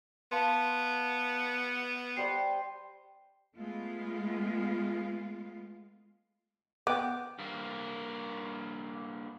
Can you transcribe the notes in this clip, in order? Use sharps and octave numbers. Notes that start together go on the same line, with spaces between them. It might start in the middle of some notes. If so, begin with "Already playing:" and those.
B3 F5 A5 C6
G3 C5 G5 C7
G#3 A3 B3 F4
B3 G5 D6
G2 A#3